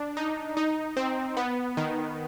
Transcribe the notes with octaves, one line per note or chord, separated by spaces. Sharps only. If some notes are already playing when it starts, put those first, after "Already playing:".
Already playing: D4
D#4
D#4
C4
B3
D#3